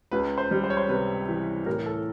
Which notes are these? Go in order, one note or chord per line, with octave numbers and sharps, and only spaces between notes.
C#2 B4
C5
G3
C5
C#5
C5
C3 B4
E3
A2 A#4
A4